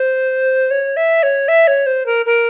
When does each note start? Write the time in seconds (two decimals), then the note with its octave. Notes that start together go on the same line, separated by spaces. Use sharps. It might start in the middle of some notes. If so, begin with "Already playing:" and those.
Already playing: C5
0.71 C#5
0.97 E5
1.23 C#5
1.48 E5
1.67 C#5
1.86 C5
2.06 A#4
2.26 A#4